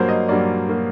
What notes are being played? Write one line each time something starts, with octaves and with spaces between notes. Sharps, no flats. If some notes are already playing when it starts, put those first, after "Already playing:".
Already playing: G2 F#3 A#3 C5
D#5
G2 F#3 A#3 D5
F#3 A#3